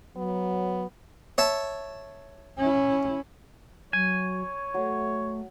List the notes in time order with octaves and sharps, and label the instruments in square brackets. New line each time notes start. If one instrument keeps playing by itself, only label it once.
[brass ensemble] F#3 [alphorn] B3
[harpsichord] C#5 E5 A5
[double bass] C#4 E4
[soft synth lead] F#3 [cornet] C#5 [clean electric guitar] G#5
[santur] F#3 [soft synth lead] A3